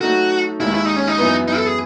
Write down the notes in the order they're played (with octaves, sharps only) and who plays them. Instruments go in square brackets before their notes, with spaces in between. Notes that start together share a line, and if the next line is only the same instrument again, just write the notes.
[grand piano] F#3 A3 D#4 A4 [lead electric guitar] F#4
[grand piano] D#2 D#3 G#3 [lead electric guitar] E4
[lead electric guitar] E4
D#4
C#4
D#4
[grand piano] F#2 E3 B3 E4 B4
[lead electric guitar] D#4
A4
G#4